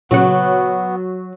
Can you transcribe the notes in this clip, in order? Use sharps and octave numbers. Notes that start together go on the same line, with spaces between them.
A#2 C#3 F#3 B3 F#5